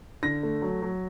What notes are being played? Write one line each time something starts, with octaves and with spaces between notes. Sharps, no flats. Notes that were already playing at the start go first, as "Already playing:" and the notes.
D3 A#6
A3
F#3
F#3